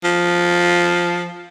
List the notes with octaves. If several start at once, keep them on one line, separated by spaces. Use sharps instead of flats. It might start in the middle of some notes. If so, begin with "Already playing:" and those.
F3